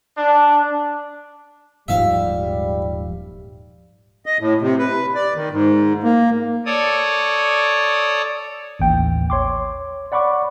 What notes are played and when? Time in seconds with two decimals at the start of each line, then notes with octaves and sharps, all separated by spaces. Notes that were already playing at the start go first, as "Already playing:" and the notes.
0.18 D4
1.88 D#1 G#2 F3 G3 E5 F5
4.26 D#5
4.40 A2
4.61 C3
4.79 B4
5.15 D5
5.35 D#3
5.51 G#2
6.03 A#3
6.65 A4 C#5 D5 D#6
8.80 A1 D#2 G5
9.30 C#5 C6 D6
10.12 D5 F#5 B5 C#6 D6